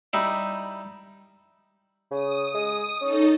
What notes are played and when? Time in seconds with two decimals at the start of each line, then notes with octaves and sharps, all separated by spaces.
0.13 G3 D#4 E4
2.11 C#3 D#6
2.54 G#3
3.01 C#4 D#4 A4